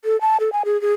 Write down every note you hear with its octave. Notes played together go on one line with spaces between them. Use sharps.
A4
A5
A4
G#5
G#4
G#4